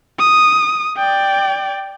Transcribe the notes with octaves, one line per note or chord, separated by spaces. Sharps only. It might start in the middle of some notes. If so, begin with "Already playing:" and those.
D#6
D5 G5